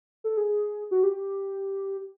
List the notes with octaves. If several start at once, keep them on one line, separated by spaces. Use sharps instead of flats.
A4
G#4
F#4
G4